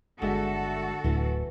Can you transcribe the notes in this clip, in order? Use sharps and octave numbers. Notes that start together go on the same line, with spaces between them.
G1 D3 G#3 F#4 A4 E5
D1 D2 E3